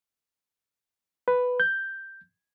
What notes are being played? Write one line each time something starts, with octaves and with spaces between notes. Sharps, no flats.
B4
G6